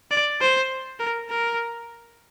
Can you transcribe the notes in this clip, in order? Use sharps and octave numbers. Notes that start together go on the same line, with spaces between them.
D5
C5
A#4
A#4